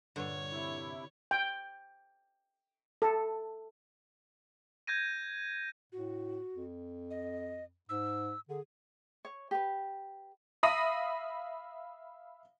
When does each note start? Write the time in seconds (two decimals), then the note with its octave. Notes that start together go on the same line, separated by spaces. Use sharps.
0.16 G2 A#2 D3 C#5
0.52 C3 E4
1.31 G5
3.02 A4
4.87 G6 G#6 A#6 D#7
5.92 A2 F#4
6.54 F2
7.11 D#5
7.89 G#2 E6
8.49 D3 G#4
9.25 C#5
9.51 G4 B4
10.63 E5 F5 B5 D#6 A#6 D#7